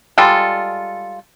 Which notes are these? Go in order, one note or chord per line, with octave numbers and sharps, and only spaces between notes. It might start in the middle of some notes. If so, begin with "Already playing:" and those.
G3 G#3 F4 A4